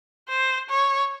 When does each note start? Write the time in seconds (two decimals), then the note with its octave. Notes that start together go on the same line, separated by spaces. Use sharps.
0.29 C5
0.70 C#5